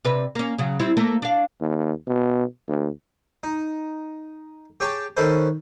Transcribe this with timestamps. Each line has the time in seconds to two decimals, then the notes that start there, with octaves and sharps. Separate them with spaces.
0.05 C3 D4 B4
0.35 A#3 C#4
0.58 C#3 F#3
0.80 G3 C4 E4
0.97 A3 A#3 A#4
1.22 D4 F5
1.61 D#2
2.07 B2
2.68 D2
3.43 D#4
4.80 G4 G#4 C#5 G5 A5
5.17 D#3 C#4 A4 B4 C5